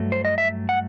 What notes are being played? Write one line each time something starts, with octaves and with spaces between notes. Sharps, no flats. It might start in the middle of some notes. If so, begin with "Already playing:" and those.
Already playing: G2 F#3 A3
C5
D#5
E5
F#5